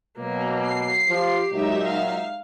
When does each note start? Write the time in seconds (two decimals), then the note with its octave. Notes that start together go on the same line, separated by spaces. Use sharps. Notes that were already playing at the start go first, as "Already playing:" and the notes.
0.18 B2 F#3 A#3
0.65 C7
1.08 F3 G4
1.52 A#2 F#3 G#3 D#4 E5
1.84 F5